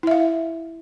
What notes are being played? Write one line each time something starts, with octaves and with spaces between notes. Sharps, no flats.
E4 E5 F5